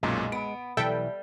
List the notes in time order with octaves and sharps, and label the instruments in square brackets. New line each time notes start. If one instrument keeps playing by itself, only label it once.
[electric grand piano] B1 F#2 A#2 [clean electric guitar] G#3
[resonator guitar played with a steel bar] B3 [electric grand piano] D7
[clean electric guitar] B1 E3 [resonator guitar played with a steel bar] G3 [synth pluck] A4 E5 G5